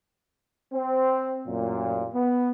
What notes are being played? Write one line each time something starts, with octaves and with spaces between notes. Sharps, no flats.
C4
A1 F#2 A#2
B3